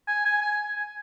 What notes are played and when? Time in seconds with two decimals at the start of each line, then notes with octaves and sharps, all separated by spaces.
0.08 G#5
0.25 G#5
0.42 G#5